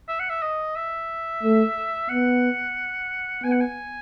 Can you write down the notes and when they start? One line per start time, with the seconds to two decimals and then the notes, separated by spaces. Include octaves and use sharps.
0.08 E5
0.20 F#5
0.30 E5
0.42 D#5
0.76 E5
1.43 A3
2.09 B3 F#5
3.44 B3 G#5
3.52 F#5
3.61 G#5